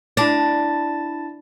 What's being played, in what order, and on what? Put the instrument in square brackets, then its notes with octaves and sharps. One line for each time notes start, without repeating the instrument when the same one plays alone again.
[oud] D4 [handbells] E4 A5 A6